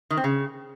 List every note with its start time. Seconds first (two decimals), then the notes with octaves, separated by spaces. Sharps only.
0.10 D#3
0.17 C4
0.24 C#3